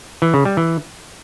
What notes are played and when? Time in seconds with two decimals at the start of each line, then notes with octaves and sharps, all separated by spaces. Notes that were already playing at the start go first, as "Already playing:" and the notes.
0.22 E3
0.34 C#3
0.45 G3
0.57 E3